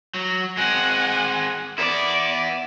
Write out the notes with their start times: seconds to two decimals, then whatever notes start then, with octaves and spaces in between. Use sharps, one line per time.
0.14 F#3
0.57 G#3 C4 F#5 G#5
1.78 B3 E4 D5